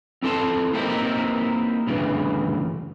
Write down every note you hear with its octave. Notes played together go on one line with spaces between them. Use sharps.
C4 E4 A4 G5 A5 C6
A#3 C4 D#4 E4 G4 A#4
D2 G2 C#3 E3